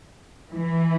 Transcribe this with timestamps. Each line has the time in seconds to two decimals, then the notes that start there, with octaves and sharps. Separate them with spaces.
0.51 E3